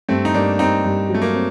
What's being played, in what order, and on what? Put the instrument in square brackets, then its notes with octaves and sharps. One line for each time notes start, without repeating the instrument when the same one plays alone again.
[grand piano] G2 [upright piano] A3 C4
[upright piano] D#4
[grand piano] G2 [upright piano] A#3 D4
[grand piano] G2 [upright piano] C4 D#4
[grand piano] G2
[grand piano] F#3 [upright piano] A3
[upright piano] A#3
[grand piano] C4